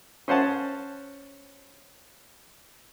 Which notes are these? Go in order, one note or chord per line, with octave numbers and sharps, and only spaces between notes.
C#4 C5 F#5 A5